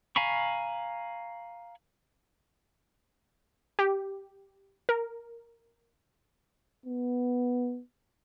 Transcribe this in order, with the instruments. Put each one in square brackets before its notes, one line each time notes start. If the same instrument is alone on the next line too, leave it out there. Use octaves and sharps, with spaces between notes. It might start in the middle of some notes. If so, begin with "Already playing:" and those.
[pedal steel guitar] F5 G#5 A#5 B5 C#6
[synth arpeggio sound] G4
A#4
[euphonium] B3